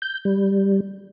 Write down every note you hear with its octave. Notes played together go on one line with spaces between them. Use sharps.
G6
G3